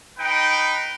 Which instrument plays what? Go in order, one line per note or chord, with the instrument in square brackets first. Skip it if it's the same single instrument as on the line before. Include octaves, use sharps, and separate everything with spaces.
[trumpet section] D#4 B4 G5